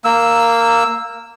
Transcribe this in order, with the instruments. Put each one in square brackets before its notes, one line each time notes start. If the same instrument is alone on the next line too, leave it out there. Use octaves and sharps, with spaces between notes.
[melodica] A#3 E6